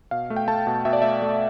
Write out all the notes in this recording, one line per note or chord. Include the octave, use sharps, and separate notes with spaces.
B2 F5
A3
G5
A3 A5
B2
B2 E5
D5
A3 E5
A3